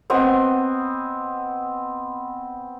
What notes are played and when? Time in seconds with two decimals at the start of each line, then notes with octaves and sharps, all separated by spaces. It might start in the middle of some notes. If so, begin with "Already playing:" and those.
0.10 B3 C4 D#5 G#5